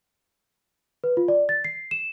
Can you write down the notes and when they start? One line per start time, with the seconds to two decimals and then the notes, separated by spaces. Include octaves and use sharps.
1.04 B4
1.17 F4
1.28 D5
1.49 A6
1.64 C7
1.91 E7